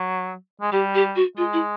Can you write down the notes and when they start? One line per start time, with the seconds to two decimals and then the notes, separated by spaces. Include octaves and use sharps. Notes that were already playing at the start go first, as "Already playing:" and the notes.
Already playing: F#3
0.61 G#3
0.72 G3 G4
0.95 G4
1.16 F#4
1.37 G#3 F4
1.53 E4